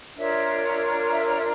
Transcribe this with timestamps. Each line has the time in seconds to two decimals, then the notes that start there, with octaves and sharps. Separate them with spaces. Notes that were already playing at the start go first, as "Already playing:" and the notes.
0.16 D4 F4 A#4 C#5 E5
1.11 E5
1.26 C#5
1.36 E5